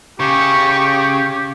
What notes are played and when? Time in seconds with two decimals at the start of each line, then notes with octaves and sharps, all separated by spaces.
0.20 C#3 G4 C#6